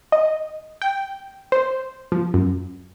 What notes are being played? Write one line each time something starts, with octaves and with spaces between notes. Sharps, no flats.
D#5
G5
C5
F3
F#2